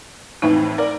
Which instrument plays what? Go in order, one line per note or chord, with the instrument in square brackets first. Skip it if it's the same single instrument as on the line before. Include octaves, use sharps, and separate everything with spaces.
[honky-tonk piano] F2 A2 E3 [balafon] D#4
[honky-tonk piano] A#4 D5